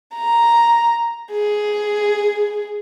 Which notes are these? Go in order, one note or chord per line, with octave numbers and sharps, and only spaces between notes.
A#5
G#4